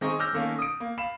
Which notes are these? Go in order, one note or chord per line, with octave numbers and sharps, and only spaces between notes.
D#3 C4 G#4 D#5 A#5 C#6
D6 E6 F6 G6 A#6
D#3 A3 A#3 C#4
D#6 D7
A#3
F5 B5 E7